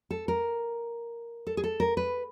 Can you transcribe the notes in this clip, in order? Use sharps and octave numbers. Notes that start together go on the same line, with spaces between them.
A4
A#4
A4
G#4
A4
A#4
B4